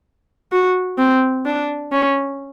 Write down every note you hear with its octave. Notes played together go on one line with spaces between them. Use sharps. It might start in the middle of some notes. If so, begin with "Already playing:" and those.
F#4
C4
D4
C#4